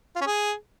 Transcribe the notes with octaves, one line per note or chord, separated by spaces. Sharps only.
F4
C#4
G#4